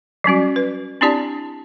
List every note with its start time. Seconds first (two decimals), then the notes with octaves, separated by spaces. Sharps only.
0.24 F#3 G3 C#4 F#4
0.56 B4
1.01 C4 D4 E4 G4 D5 A5